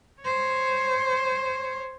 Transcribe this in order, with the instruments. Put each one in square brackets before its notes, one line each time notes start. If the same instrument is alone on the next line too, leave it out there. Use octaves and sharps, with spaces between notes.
[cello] C5 C#5